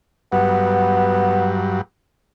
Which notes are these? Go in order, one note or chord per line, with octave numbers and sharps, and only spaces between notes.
G2 F#3 B3